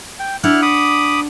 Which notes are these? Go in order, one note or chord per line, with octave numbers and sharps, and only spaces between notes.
G5
D4 E4 F#5 F6 F#6
B5 D6 D#6